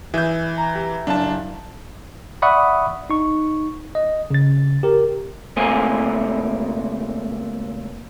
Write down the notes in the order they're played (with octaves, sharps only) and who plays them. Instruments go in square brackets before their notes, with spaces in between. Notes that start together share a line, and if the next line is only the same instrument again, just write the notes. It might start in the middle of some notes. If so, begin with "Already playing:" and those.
[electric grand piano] E3 G6 [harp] G#4 E5
[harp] A#5
G4
[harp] F#1 [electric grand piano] D4 A5
[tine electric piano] D5 E5 F#5 B5 C#6 D#6
D#4 C#6
D#5
C#3 A6
G4 A#4
[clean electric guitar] C#2 A#2 A3 C4 G#5